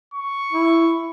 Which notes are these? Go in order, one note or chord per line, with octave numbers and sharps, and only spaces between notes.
C#6
E4